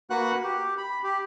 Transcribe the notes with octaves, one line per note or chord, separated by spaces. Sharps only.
A#3 F#4 B4 F#5 F#6
G4
B5
G4